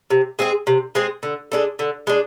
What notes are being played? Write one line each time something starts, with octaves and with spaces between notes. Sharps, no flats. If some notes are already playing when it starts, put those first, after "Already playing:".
C3
G#3 C4 G#4
C3
G#3 C4 G#4
D3
G#3 D4 A4
D3
G#3 D4